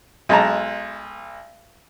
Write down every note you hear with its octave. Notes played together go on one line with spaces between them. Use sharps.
B1 G#3 A5 A#5